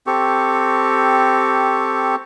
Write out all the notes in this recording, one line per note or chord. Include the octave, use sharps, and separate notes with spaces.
C4 G4 A4 C#6